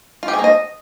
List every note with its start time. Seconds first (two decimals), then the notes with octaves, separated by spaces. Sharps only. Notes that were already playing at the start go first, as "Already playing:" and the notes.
0.23 F4
0.28 G4
0.33 G#4
0.39 A#3
0.44 D#5